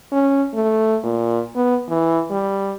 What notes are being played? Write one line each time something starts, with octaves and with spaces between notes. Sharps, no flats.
C#4
A3
A#2
B3
E3
G3